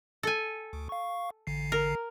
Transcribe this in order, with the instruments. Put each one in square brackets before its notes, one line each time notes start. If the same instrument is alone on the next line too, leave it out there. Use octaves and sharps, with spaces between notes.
[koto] A4 G#5
[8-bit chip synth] D2
F5 C#6
A1 D3 C7
[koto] A#4